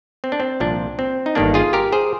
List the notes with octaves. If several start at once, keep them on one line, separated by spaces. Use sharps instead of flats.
C4
D4
C4
C2 A#2 F3 D4
C4
D#4
G1 G2 D#3 A#3 D4
F4 G#4
G4 A#4
G#4 C5